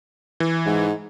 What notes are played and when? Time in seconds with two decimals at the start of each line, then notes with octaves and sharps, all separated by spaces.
0.40 E3
0.66 G#2